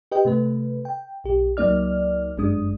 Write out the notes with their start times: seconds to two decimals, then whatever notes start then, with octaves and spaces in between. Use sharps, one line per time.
0.11 G4 B4 D#5 G5
0.25 C3 A3 B4
0.85 G5
1.24 B1 G4
1.57 C#2 F#3 A#3 D#4 D5 F6
2.38 G1 F#2 G#3 D4 D#6